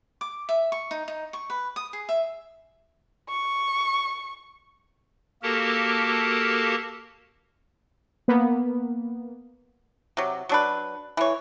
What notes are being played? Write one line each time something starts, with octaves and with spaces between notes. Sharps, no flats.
D6
E5
C#6
D#4
D#4
C#6
B4
D#6
G#4
E5
C#6
A#3 F#4 G4 A4 A#4 A5
A#3 B3
C3 F#3
F#3 D4 B4
E3 C#5